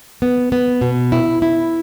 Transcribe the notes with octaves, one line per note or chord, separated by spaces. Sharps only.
B3
B3
B2
E4
E4